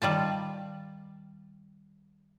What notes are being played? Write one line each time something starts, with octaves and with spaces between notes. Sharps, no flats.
D#3 G3 F4 A5